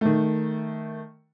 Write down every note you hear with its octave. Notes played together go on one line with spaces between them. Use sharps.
D#3 A3